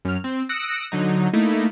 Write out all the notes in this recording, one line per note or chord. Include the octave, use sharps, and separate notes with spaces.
F#2 F6
C4
D#6 E6 F#6 A#6 C#7 D7
D3 F#3 D#4
A3 A#3 D#4 E4